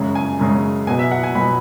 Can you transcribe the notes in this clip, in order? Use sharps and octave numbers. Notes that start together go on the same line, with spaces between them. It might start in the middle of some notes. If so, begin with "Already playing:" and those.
Already playing: F#2 C#3 G#3 C#4
G#5
F#2 C#3 G#3 C#4
B2 F#3 B3 G#5
E5
F#5
G#5
B2 F#3 B3 B5